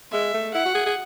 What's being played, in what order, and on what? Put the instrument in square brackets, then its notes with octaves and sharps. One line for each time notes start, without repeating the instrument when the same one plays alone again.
[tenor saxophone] G#3 [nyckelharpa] E5
[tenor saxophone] A3
[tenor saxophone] E4 [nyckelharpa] F#5
[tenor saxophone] F#4
G#4
G#4